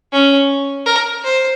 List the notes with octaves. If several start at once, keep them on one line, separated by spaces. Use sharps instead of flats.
C#4
A#4
C5